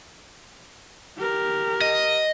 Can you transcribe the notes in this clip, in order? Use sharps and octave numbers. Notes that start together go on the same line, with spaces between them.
G4 A#4
D#5